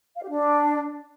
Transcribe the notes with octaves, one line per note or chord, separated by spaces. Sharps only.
F5
G4
D4